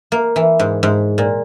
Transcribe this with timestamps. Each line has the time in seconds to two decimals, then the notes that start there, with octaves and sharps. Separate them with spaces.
0.12 A#3
0.36 E3
0.59 G#2
0.83 G#2
1.18 A#2